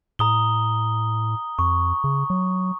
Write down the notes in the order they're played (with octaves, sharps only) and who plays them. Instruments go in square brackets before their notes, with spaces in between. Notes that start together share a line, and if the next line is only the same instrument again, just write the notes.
[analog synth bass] A2 [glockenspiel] A#5 D#6 G7
[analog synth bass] F2 [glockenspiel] C#6
[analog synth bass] C#3
F#3